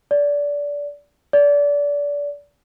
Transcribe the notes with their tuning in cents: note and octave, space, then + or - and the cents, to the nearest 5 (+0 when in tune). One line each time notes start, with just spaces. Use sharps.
D5 -20
D5 -25